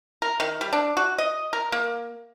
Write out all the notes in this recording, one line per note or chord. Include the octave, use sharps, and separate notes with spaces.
A#4
D#3
G3
D4
F#4
D#5
A#4
A#3